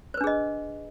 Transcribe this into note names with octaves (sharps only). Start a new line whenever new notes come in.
D4 G#4 B4 C5 D#5